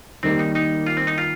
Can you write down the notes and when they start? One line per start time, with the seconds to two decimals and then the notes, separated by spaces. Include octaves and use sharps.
0.23 D#3 G3 A#3 C4
0.39 D#4
0.55 D#4
0.86 F4
0.97 C4
1.07 D#4
1.18 F4